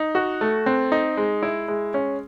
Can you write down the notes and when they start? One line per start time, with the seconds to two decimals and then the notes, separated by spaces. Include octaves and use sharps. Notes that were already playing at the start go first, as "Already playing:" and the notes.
Already playing: D#4
0.15 F#4
0.41 A3
0.66 C4
0.92 D#4
1.17 G#3
1.43 E4
1.68 G#3
1.94 C#4